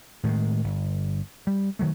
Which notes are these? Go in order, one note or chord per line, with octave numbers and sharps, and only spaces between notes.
A2 D#3 E3 G#3
G1
G3
D#3 F#3 A3